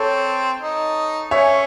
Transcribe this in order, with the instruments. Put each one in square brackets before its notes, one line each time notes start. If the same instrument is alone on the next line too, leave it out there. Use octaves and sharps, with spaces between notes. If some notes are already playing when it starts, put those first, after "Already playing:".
Already playing: [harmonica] C4 [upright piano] A4 C#5
[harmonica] D#4
[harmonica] C#4 [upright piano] C#5 E5